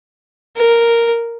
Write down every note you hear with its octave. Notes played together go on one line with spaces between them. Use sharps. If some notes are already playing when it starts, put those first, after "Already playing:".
A#4